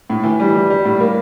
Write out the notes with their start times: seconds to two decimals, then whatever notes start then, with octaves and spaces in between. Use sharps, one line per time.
0.10 A2
0.24 E3
0.40 G3
0.54 G3
0.70 G3
0.85 A2
1.00 A#3